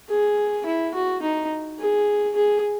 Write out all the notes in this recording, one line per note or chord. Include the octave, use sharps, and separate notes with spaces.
G#4
E4
F#4
D#4
G#4
G#4